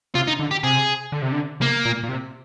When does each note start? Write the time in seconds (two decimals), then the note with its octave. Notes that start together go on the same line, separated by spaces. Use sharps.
0.15 C3 F4
0.27 D#4
0.39 D3
0.51 G4
0.63 C3 G#4
1.12 D3
1.22 C3
1.32 D3
1.60 C3 A#3
1.85 A#2
2.03 A#2
2.09 C3